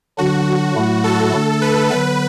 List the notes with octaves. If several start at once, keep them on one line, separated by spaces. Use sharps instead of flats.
D3 F#3 D4 F#4
A2 F#3 A3 E4
A4
D3 A3 D4
B4
D3 F#3 B3 B4